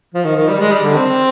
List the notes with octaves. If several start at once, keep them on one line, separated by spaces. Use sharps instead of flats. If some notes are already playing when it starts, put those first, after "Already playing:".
F3
D#3
D#3
G3
G#3
G3
D3
C4